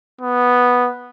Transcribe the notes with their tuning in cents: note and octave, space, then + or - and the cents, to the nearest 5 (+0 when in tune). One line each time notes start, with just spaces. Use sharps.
B3 -5